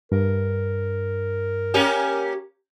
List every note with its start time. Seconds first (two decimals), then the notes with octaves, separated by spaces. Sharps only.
0.12 G2 A#4
1.74 A#3 C#4 G4